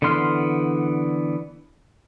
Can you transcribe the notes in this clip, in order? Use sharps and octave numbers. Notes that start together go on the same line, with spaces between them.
D3 E3 B3 C6 F6